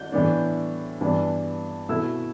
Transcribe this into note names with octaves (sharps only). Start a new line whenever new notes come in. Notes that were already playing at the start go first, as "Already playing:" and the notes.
Already playing: G6
A2 E3 B3 D4
G2 E3 B3 D4
B2 A3 E4 E6